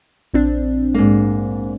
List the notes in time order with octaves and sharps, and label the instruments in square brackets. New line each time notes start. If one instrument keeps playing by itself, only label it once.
[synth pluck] A#1 C4 D4
[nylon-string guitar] G#2 A#3